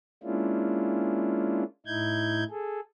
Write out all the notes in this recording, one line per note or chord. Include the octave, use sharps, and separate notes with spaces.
G#3 A#3 C#4 D4 E4 F4
A2 D#4 E4 G6 G#6
G#4 A4